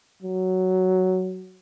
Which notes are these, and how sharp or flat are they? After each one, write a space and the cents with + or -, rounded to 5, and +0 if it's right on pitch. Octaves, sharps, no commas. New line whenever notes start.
F#3 +5